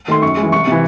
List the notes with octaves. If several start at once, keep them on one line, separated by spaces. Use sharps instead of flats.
D#3 A3 C6
F#2 C#6
G#3
E3
C2 C#6
C3 E3